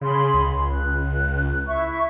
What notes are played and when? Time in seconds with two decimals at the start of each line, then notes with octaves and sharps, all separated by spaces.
0.01 C#3 G#4 B5 C6
0.34 C#2
0.71 F#6
1.66 E4 E5 C#6